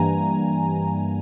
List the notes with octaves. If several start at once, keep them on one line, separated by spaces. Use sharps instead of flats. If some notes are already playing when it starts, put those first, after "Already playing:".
Already playing: G2 E3 G3 A#3 G#5 A#5